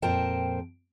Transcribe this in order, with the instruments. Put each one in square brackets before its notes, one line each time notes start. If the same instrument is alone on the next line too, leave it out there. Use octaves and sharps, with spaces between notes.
[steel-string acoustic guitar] F2 A#2 A#4 C5 G5 A5